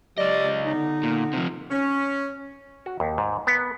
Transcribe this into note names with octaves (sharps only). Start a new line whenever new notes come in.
C#2 F#3 G4 D5 D#5
D3 B3 D#4
A#2
C3 F3
C#4
F#4
D#2
G#2
B3